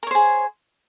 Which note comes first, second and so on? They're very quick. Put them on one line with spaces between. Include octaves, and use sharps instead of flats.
A#4 C#5 C5 G#4